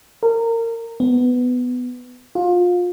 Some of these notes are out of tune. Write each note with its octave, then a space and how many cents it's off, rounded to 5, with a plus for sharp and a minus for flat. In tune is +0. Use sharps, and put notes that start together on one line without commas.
A#4 -25
B3 +10
F4 +25